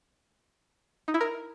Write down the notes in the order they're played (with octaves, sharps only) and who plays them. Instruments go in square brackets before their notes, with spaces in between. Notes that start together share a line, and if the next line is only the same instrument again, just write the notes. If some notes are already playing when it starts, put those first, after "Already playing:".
[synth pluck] D#4
E4
A#4